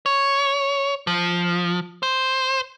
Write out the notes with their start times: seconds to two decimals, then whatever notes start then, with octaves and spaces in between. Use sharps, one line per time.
0.06 C#5
1.07 F3
2.03 C5